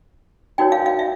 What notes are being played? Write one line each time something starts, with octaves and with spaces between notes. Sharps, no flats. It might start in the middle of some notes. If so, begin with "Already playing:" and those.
D#4 F#4 A#4 C#5 G5
F5
F5
E5